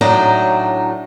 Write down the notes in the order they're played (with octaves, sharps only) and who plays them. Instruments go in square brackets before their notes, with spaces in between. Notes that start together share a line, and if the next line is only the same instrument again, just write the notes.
[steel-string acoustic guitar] A2 F#3 D4 D#4 A#5